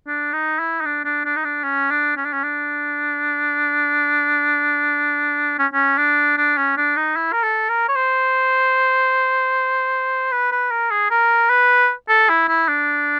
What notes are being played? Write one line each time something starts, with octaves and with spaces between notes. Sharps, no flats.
D4
D#4
E4
D#4
D4
D4
D4
D#4
D4
C#4
D4
C#4
D4
C#4
D4
C#4
C#4
D4
D4
C#4
D4
D#4
E4
A#4
A4
A#4
C#5
C5
B4
B4
A#4
G#4
A#4
B4
A4
E4
E4
D4